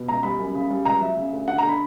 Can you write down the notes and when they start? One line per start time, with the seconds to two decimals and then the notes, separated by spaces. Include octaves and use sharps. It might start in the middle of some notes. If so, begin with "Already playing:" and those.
Already playing: B2
0.08 C#2 A#5
0.23 G3 B5
0.39 F#2
0.55 C#3
0.70 G3
0.85 C#2 A#5
1.01 F#3 E5
1.17 C#3
1.33 D2
1.48 D3 F#5
1.58 A#5
1.63 D3
1.69 B5